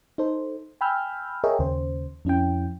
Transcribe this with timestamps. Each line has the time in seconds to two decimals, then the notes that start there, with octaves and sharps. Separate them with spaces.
0.18 D#4 A4 C5
0.81 G5 G#5 B5 E6 F6 G6
1.44 G#4 A#4 C#5 D#5 E5 G5
1.59 D#2 C#3 C5
2.25 F2 C#4 E4 G5